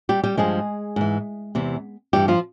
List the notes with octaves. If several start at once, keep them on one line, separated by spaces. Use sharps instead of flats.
G3 G4
G3 G4
G2 F3 G#3 G#4
G#2 E3
E2 C3 E3
G2 E3 G3 G4
F3 F4